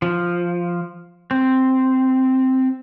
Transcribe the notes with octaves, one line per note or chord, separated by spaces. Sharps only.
F3
C4